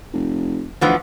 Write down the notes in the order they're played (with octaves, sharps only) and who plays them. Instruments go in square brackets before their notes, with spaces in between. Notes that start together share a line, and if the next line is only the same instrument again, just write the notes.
[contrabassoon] F1
[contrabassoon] D2 [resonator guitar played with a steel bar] E3 F3 B3